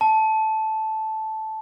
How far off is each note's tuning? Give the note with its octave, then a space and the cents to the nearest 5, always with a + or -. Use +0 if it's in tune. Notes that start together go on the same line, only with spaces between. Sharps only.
A5 -5